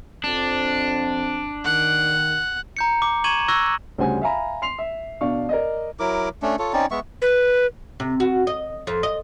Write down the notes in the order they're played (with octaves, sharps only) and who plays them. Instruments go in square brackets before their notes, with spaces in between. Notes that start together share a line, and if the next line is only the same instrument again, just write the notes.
[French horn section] F2 C4 [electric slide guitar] D4
[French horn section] D#3 [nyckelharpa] F#5
[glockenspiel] A#5 G6 C#7
D6
C#6 G#6 D#7 E7 F#7
C#6 E6 F#6 G#6 A#6
[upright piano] D2 C#3 G3 C5 F#5 G#5
E5 F5 G#5 A#5 B5
C6 C7 F7
E5
B2 D4 F5 C#6
A#4 D5 D#5
[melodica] F#3 E4 A#4 D6
A3 C#4 D4
F4 A4 C#5
C4 C#4 D#4 D5
G#3 B3 E5 C#6
[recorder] B4
[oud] C3
F#4
D#5
F2
D#5